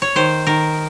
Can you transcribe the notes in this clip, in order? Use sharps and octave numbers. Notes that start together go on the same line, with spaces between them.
C#5
D#3 C5
D#3 A#4